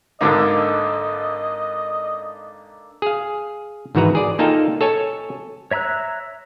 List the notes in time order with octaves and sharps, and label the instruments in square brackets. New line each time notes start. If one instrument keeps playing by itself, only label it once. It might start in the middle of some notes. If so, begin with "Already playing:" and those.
[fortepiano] G#1 D3 D#4 [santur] A#3 D4 A4 [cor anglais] D#5
[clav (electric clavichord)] G#4 F5
G#2 D#3 E3 F#4 B4 A#5
G#4 D5
A#3 D#4 F4 A4 F5 G5
A4 C#5 G#5 A5
[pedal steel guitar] C#5 E5 A#5 E6 F#6